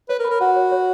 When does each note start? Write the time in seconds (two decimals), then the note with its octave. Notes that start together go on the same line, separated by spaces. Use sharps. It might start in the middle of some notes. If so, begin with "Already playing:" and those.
0.09 B4 C#5
0.19 A#4
0.25 B5
0.30 A#4
0.41 F#4 F#5
0.56 C#5
0.72 C#5